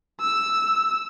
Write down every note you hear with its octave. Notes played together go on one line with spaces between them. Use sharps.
E6